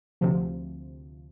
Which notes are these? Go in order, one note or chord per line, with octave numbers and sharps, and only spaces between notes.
D2 C3 F3